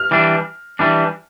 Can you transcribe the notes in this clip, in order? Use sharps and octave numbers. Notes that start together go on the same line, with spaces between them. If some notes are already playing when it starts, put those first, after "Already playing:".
Already playing: F6
E3 G3 D4
E3 G3 D4